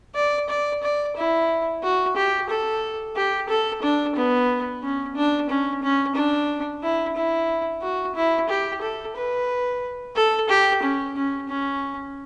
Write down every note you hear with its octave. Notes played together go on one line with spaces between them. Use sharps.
D5
D5
D5
E4
F#4
G4
A4
G4
A4
D4
B3
C#4
D4
C#4
C#4
D4
E4
E4
F#4
E4
G4
A4
B4
A4
G4
C#4
C#4
C#4